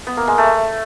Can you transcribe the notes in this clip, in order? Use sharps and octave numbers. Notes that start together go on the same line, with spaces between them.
B3
A#3
G#3
A3